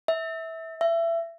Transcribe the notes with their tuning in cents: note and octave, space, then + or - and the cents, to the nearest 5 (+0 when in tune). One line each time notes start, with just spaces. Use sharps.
E5 -20
E5 +25